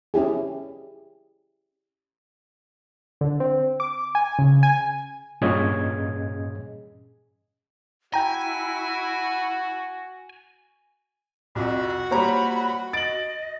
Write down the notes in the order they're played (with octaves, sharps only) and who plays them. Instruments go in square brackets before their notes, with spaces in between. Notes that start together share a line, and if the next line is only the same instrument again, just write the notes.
[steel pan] C#4 E4 G4 G#4
[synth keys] D3
C4
D6
G#5
C#3
G#5
[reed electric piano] G2 A#2 C#4 G#4 D#5 G#6
[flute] E4 [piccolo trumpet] F#4 [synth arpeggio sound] G5 A#5 [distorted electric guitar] G#5
[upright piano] C2 F2 [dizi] F#4
[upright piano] A#2 G3 [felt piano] C5 C#5 A#5 [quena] B5
[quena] D#5 [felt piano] A6 [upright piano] D7 F#7